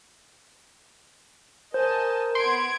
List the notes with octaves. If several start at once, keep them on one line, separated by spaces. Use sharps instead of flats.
A#4 C5 D#5 G#5 A5
B3 C6 G#6 D7